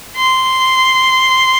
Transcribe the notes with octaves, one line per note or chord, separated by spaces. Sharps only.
C6